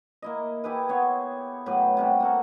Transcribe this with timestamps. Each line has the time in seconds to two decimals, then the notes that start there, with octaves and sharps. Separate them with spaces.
0.22 A#3 E4 D#5
0.64 E4 G4 G#4 B4
0.89 B3 C#5 C6
1.66 A2 F#3 G4 B4
1.97 C3 G3 F#4
2.20 A#3 F#4 A4